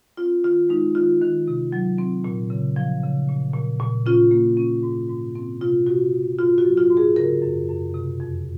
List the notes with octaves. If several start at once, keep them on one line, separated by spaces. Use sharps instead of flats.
C4 F4
D#3 F4
G#3 D#4
D#3 F4
D#3
C3
F#3
C4
A#2
C#3
F3
C#3
A#2
A#2
A#2
C#4 F4
A#3
C#4
G#2
G#2
C4
C3 F4
C3 F#4
C3
G#2 F4
F#4
F#3
F4
G#2
G#4
C#3 A#4
F#2
F#2
C3
F2